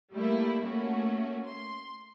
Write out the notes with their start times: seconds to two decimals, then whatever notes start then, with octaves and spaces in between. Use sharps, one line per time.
0.13 G3 A3 A#3 E4
0.64 A3 A#3 C#4 F#4
1.46 C6